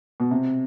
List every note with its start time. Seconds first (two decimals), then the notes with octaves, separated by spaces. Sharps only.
0.20 B2
0.31 C3